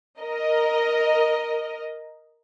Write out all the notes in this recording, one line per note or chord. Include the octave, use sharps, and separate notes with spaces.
A#4 D#5